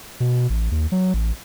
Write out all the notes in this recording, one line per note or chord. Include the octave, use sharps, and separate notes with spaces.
B2
A1
D#2
F#3
A1